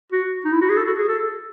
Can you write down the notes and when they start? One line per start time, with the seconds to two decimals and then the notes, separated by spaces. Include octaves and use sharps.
0.12 F#4
0.45 D#4
0.52 E4
0.61 F#4
0.69 G#4
0.77 A4
0.87 F#4
0.98 G#4
1.08 A4